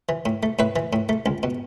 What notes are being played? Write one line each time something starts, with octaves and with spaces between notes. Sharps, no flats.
E3
A2
A3
A2 B4 E5
E3
A2
A3
C#2
B2